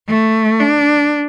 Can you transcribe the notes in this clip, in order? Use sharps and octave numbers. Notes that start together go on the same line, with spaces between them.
A3
D4